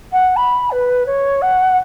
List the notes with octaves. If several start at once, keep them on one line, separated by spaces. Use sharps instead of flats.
F#5
B5
B4
C#5
F#5